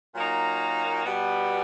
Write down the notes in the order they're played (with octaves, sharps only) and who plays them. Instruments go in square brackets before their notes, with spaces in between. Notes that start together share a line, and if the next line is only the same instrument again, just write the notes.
[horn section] A#2 F#3 A#3 D#4
B2 G3 B3